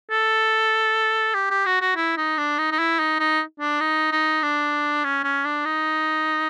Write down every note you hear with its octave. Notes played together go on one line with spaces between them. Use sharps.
A4
G4
G4
F#4
F#4
E4
D#4
D4
D#4
D#4
E4
D#4
D#4
D4
D#4
D#4
D4
C#4
C#4
D4
D#4